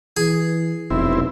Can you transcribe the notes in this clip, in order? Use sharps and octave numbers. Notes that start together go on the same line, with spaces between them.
E3 G#4
F1 B1 C4 E4